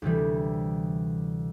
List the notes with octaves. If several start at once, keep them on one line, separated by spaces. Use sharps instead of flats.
D2 C3 E3 G3